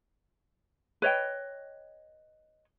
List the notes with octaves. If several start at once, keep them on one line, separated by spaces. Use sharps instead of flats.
B4 C#5 D#5 G5